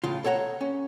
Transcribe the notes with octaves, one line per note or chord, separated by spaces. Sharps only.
A2 C#3 F4
A4 C#5 F#5 G5 A#5
C#4